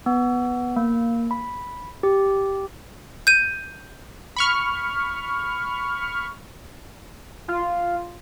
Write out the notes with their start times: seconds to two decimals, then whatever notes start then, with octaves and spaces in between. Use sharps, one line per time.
0.06 B3
0.76 A#3
1.31 B5
2.03 G4
3.27 G6 D#7
4.36 B5 C#6 F6
7.48 F4